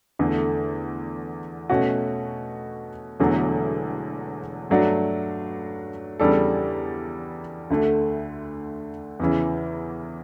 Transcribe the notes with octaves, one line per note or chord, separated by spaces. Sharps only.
E2 D3 A3
B2 A3 C#4 F#4
E1 E2 D3 F#3 A3
G2 F#3 A3 D4 F#4
E2 C#3 G3 D4 A4
D2 D3 A3
E2 C#3 E3